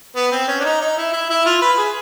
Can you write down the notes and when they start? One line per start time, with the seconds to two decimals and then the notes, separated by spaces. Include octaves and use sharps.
0.16 B3
0.32 C4
0.48 C#4
0.60 D4
0.64 D#4
0.81 D#4
0.97 E4
1.13 E4
1.30 E4
1.46 F4
1.62 B4
1.77 G#4